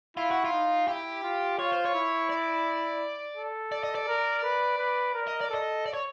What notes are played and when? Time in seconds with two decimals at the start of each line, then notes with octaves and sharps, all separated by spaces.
0.17 E4 F4
0.31 F#4
0.45 F4
0.53 D#4
0.88 E4 G4
1.23 F4
1.58 F4 C#5
1.72 C5
1.85 C#5
1.95 E4
2.29 D5
3.37 A4
3.72 D5
3.84 D#5
3.95 D5
4.08 A#4
4.43 B4
4.78 B4
5.15 A#4
5.28 D#5
5.41 D5
5.50 A4 D#5
5.86 D5
5.94 C#5